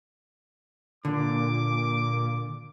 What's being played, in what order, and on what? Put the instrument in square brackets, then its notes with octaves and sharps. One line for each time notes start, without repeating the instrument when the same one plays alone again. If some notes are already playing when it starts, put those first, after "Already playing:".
[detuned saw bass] A#2 [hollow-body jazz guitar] D3 [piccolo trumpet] D6